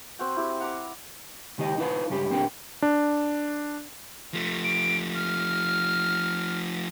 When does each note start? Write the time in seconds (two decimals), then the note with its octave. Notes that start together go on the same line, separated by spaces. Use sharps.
0.19 C4 F#4 G5
0.36 E4 G4
0.60 F#5 A#5 B5 D6
1.58 C#2 D#3 G4 D#5
1.78 D#4 F4 B4 E5 F5 A5
2.10 C#2 G2 C#4 G4
2.31 A#2 C4 D4 G4 A#4 G5
2.82 D4
4.34 F3 A3
4.64 D7
5.15 F6